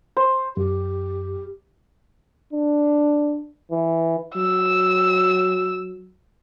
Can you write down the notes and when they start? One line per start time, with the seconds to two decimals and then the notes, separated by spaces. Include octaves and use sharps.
0.17 C5
0.57 F#2 G4
2.53 D4
3.71 E3
4.36 F#3 E6